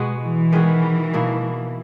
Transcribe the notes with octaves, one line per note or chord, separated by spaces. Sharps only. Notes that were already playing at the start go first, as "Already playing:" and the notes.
Already playing: B2 G#3 B3 F#4
E3
D#3 G#3 B3 F#4
B2 A#3 E4